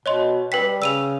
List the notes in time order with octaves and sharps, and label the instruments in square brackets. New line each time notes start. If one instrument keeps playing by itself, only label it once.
[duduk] B2 [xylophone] C#5 D#5 C6
[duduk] G3 [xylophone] B4 G5 B6
[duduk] C#3 [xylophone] E6 D#7 F7